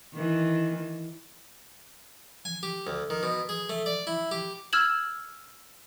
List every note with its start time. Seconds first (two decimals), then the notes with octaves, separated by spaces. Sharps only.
0.14 D#3 E3
2.45 G#5
2.63 G4
2.87 D2
3.10 D#3
3.23 B2
3.49 G#4
3.69 A3
3.86 D5
4.07 E4
4.31 G4
4.73 E6 F6 G#6 E7 F#7